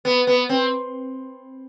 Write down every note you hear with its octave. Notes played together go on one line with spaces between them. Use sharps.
B3
B3
C4